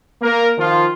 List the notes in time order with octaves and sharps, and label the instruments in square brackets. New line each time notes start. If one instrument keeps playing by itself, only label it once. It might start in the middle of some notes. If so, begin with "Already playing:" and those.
[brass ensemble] A#3 A#4
D#3 F3 F4